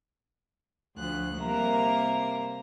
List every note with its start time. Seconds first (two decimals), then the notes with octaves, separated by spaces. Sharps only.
0.96 D2 F3 F#6
1.37 C3 G3 A#3 A#4 E5 A#5